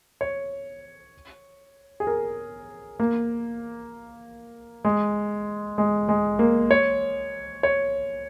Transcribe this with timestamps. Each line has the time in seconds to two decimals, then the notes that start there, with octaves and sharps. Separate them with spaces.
0.21 C#5
2.00 G#4
2.07 A#4
3.00 A#3
4.85 G#3
5.78 G#3
6.09 G#3
6.39 A#3
6.71 C#5
7.63 C#5